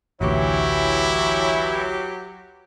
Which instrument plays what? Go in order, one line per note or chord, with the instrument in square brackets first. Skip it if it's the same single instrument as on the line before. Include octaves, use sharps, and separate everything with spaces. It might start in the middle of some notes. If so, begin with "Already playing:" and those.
[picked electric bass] A1 D2 [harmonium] E3 C#5 [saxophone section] F#3 G4 [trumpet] E4